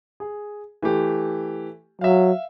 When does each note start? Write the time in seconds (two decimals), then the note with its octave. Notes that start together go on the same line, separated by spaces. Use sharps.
0.20 G#4
0.82 E3 A3 G4
2.01 F#3 E5 F5